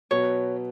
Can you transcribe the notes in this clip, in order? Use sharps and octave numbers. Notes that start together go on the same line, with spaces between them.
B2 F#3 B3 C#5